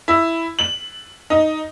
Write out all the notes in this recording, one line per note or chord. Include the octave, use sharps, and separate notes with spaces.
E4
F#7
D#4